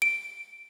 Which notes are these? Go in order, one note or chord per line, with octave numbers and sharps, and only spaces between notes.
D7